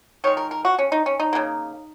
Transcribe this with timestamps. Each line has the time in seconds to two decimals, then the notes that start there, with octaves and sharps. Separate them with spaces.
0.24 D#3 G#3 C#5
0.37 A#4
0.51 A#4
0.65 F#4
0.79 C#4
0.92 D#4
1.06 C#4
1.20 D#4
1.33 C#3 F#3 A#3